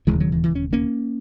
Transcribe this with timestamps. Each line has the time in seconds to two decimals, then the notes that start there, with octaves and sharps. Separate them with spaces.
0.07 E1 D#2 C#3 E3 G#3
0.20 D#3 F#3
0.32 E3
0.43 E3
0.55 C#4
0.73 A#3 C#4